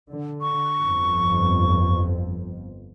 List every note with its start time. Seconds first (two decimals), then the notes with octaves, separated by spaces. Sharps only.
0.10 D3
0.41 C#6
0.78 G1 F2